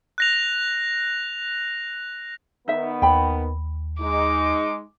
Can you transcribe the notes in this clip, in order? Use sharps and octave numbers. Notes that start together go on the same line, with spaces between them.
F#6 A#6 F7
D#3 B3 D#4 E5
D#2 G5 B5
G#3 D#4 D6